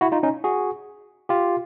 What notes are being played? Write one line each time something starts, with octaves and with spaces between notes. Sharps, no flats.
E4 F#4
D#4 F4
C#4 D#4
F#4 G#4
F4 G4